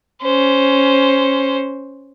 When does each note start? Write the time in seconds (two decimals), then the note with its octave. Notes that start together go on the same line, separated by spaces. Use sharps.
0.22 C#4 C5